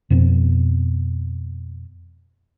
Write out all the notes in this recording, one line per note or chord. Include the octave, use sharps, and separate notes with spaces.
F2 B2 C4